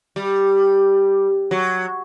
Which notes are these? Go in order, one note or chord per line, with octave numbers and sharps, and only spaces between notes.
G3
F#3